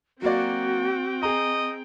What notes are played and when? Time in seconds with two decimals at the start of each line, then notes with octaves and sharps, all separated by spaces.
0.22 F#3 A#3 C4 F#4 D5 G5
1.23 G#4 D#5 A#5